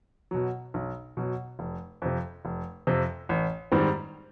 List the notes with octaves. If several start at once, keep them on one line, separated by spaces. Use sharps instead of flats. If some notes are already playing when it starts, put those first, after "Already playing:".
B2 F#3
B1
B2 F#3
F1
F2 C3
F1
F2 C3
A1
G#2 D#3 G3 C4